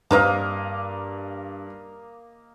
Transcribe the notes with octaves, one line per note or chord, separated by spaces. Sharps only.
G2 A#3 C4 B4 D#5 F5 A#5